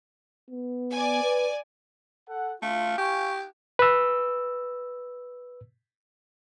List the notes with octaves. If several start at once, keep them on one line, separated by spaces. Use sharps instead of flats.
B3
D5 G#5
B4
A4 F#5
A3 F4 F5
G4 F5 G#5 C#6
B4 E6